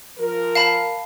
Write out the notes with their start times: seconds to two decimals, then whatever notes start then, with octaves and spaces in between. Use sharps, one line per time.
0.19 F3 A#4
0.55 F5 A5 B5